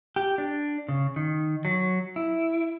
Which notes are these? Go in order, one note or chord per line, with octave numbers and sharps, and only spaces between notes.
G4
D4
C#3
D#3
F#3
E4